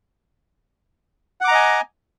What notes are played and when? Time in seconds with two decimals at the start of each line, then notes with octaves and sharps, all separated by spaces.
1.41 F#5
1.44 D6
1.48 A#5
1.51 D#5
1.55 G#5